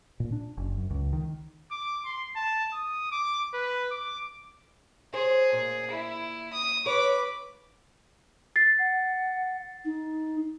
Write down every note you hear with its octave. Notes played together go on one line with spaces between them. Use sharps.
A#2
D4
F#1
F#2
C#2
D#3
D6
C6
A5
D#6
D6
B4
D6
G#4 C5
A#2
E4
D#6
B4 C#5 D6
A6 C7
F#5
D#4